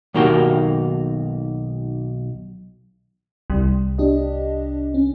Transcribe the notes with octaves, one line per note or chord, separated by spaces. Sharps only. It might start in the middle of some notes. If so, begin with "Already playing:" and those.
B1 D#3 A#3 F#4 G4
C2 G3
D4 G4 D#5
C#4